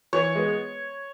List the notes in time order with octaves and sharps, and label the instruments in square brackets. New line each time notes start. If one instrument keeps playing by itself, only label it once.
[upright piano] E3 [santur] C#5
[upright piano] G#3 B3